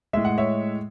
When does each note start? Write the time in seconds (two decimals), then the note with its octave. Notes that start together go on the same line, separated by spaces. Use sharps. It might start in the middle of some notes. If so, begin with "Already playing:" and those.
0.13 A2 G#3 E5
0.25 F#5
0.38 C#5 E5